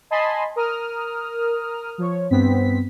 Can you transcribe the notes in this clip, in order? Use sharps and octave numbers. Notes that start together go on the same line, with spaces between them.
D#5 G#5 A5 B5 C6
A#4 D#6 F6
F3 C#5
G2 B3 C4 B6